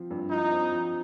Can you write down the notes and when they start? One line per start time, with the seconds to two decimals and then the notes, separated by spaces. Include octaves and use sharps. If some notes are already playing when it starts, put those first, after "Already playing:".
Already playing: F3 C4
0.11 G2
0.31 D#4 F4
0.51 C4
0.72 F3